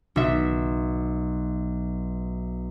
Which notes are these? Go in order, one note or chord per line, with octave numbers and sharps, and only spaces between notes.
B1 E5